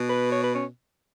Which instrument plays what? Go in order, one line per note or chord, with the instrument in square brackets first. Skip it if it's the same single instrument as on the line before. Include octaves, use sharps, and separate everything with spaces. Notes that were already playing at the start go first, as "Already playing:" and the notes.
Already playing: [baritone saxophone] B2
[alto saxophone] B4
C#5
B4
C#4